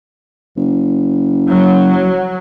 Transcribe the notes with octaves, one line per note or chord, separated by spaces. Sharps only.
F#1
F#3